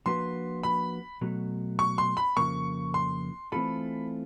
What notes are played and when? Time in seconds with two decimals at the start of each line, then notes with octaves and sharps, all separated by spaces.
0.06 F3 A#3 D4 F#4 B4 C6
0.63 B5
1.21 B2 F#3 A3
1.79 C#6
1.98 C6
2.17 B5
2.37 F2 C#3 F3 A#3 C#6
2.94 C6
3.52 E3 A3 C4 F4 A4 B5